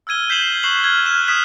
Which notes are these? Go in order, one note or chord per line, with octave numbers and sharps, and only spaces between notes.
E6 F6 G#6 D#7 G7
G6 B6 C7 D#7 E7 F#7
C#6 F#6 C7 E7 F#7 G7
F6 G#6
F6 F#6 E7
D#6 F6 F#6 B6 E7